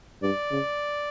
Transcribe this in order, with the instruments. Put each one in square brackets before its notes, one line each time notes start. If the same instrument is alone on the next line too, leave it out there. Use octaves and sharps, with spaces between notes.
[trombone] G2 [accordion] D5
[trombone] C#3